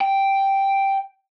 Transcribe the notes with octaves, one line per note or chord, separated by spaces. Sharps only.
G5